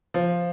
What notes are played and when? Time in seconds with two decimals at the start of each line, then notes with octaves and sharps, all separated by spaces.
0.14 F3